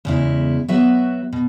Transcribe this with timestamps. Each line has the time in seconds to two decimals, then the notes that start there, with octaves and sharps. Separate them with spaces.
0.05 E2 C#3 G#3 E4
0.68 F#3 B3 F#4 B4 E5
1.33 B2